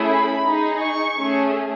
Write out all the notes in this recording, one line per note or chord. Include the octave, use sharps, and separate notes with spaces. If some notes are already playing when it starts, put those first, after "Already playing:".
Already playing: A3 C#4 E4 G#4
B5
D#4 G#4
C#6
A3 C#4 G#4